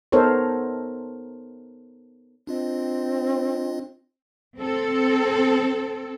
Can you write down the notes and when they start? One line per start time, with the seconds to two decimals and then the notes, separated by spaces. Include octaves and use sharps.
0.12 B3 D#4 A4 A#4 C5 C#5
2.47 C4 D4 F4 D#5
4.57 C4 A4